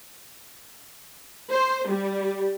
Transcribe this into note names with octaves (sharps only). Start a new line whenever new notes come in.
C5
G3